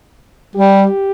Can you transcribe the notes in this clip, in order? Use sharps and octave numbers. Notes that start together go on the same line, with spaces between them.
G3 G4